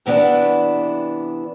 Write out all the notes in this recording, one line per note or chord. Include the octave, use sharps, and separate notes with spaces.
C3 E3 B3 D4 E4